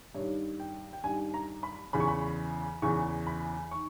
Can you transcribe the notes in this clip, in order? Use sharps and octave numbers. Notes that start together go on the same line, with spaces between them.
G2 D#3 C#5
G5
G5
G2 D#3 G#5
A#5
B5
E2 C#3 E3 B5
C#6
B5
E2 C#3 E3 C#6
B5
D#3 C#6